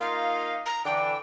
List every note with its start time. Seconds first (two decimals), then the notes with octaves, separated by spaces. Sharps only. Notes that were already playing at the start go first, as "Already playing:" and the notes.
0.01 A#3 D#4 F4 F5
0.66 A#5
0.85 D3 E3 D4 G5